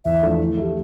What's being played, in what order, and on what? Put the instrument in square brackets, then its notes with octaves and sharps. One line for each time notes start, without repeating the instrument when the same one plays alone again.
[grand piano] E2 [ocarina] E5
[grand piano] D3 F3 A3 D4
E3
A3 E4 G4